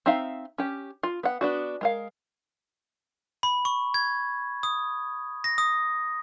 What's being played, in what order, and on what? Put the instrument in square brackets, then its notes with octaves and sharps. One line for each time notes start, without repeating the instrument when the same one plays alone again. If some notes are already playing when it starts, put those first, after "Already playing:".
[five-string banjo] C4 D#4 E5 F5
C#4 G4
F4
B3 F#5
B3 D4 F#4
G#3 A#4 F5
[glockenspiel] B5
C#6
G#6
D#6
A#6
D#6